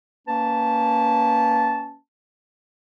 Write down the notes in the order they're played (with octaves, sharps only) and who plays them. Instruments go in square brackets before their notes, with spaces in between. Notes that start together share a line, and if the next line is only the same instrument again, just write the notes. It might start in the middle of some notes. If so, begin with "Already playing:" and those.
[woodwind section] A#3 C#4 B4 A5